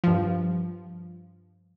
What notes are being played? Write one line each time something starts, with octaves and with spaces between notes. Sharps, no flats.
G2 F3